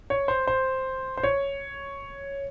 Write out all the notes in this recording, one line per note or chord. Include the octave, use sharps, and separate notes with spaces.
C#5
C5
C5
C5
C#5